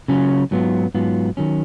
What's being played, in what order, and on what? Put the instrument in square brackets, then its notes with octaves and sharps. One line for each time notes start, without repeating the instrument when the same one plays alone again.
[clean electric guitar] C#3 F#3 C#4 F4
G#2 F#3 B3 F4
G#2 F#3 B3 F4
D#3 F#3 C#4